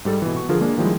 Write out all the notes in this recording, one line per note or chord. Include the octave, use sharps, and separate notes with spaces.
G#2 G3 A4
B2 E3
B2 C#6
D3 F3 D4 F4 G#4 A#4
G#3 A#3 D4
D#3 F3 G3 G#3 E4